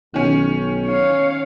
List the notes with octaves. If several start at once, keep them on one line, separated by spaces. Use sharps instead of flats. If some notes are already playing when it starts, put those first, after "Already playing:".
B1 D#3 C#4
C#5 F5